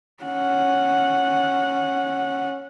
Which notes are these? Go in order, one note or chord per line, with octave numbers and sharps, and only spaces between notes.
C#4 F#5